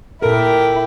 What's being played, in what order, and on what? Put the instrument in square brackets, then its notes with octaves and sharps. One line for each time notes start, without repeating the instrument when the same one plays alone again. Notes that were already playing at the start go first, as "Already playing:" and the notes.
[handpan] A#2 A4 [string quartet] E4 G4 [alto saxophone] A#4